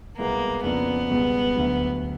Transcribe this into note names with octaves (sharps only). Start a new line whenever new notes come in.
C2 B2 G#3 A#3 B3
F2 C#3 F3 A#3 B3 D4
C#2 B2 G3
D2 D3 F#3